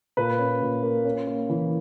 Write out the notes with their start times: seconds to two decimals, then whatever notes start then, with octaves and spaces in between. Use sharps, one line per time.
0.17 A#2 B4
0.39 C#4
0.62 A#2
0.83 A#3
1.05 C#4
1.27 A#3
1.50 E3